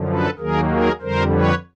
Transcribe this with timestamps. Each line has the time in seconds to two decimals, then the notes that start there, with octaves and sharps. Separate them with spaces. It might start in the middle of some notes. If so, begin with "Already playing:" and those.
Already playing: F#2 D3 F3
0.08 A4 B4
0.39 D#2 D#3 F#3 A#3 G#4 A#4
0.70 G#4 A#4
1.01 F2 D3 G3 A#4 C5
1.33 B4 C#5